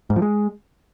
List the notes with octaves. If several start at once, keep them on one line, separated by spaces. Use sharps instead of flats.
G#2
F3
G#3